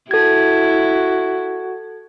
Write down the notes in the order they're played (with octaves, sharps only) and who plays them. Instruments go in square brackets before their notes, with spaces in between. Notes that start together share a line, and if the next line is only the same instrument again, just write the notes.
[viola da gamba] E4 [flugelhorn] F#4 [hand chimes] A4 G#6